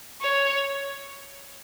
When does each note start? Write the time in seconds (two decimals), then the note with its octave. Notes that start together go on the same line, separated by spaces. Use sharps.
0.21 C#5